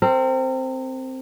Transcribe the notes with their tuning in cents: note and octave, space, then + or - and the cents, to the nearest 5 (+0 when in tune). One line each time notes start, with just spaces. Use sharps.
C4 +0 A#4 -40